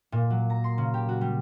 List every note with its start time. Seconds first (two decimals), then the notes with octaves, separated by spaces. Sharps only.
0.12 A#2
0.30 F#3
0.50 A#5
0.64 C6
0.78 C#3
0.94 G4
1.09 F#4
1.21 G3